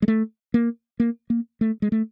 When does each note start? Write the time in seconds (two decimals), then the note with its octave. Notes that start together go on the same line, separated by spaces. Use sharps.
0.02 G#3
0.08 A3
0.54 A#3
1.00 A#3
1.30 A#3
1.61 A3
1.82 G#3
1.92 A3